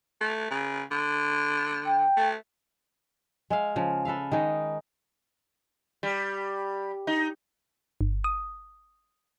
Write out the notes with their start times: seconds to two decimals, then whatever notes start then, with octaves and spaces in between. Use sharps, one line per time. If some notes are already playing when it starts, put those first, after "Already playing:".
0.21 A3
0.51 C#3
0.91 D3
1.85 G5
2.17 A3
3.50 G#3 E5 F5
3.76 C#3 F3
4.05 A4 B4 E5 F5
4.32 D#3 G#3 D#4
6.03 G3
7.07 D#4
8.01 G1
8.24 D#6